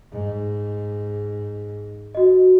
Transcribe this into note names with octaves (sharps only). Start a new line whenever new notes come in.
G#2
F#4 D#5